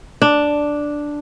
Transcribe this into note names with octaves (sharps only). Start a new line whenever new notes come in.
D4